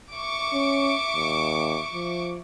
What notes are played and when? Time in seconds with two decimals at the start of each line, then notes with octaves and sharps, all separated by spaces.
0.14 E5 C#6 D6
0.53 C#4
1.16 D#2
1.94 F3